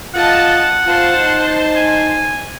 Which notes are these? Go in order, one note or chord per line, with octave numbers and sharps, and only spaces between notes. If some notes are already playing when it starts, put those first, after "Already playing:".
F4 D#5 F#5 A5
F4 C5 A5
D#4
G#5